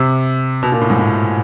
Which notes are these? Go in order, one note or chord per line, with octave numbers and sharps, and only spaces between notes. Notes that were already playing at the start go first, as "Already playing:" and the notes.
Already playing: C3
B2
A#2
A2
G#2
A2